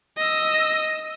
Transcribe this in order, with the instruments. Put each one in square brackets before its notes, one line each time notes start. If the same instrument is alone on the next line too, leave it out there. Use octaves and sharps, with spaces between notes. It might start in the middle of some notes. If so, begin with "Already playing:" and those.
[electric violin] D#5 E6